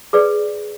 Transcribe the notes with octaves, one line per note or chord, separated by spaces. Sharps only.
G#4 B4 D5